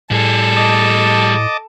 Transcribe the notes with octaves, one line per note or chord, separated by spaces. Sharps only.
A2 G3 G#4 A4
D#5 A5 D6